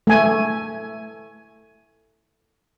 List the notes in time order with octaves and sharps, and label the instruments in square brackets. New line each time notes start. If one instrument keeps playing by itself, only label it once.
[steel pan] A3 G#5